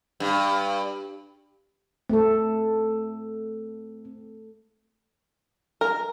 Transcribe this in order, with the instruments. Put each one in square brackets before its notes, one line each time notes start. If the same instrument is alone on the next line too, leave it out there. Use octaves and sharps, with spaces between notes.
[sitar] G2
[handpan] A3 A4 [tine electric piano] C4
[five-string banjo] A#4